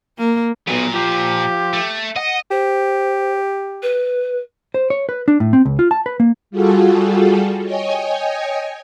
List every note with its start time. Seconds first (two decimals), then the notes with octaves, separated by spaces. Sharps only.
0.18 A#3
0.68 A#2 F#3 B3
0.94 F3 G4
1.73 A3
2.16 D#5 F#5
2.51 G4 C5
3.82 B4
4.74 C5
4.90 C#5
5.09 B4
5.28 D4
5.40 A2
5.53 C4
5.65 C#2
5.79 F4
5.91 A5
6.06 B4
6.20 A#3
6.51 G3 F4 F#4 G#4 A4
7.62 C#5 D#5 G5 G#5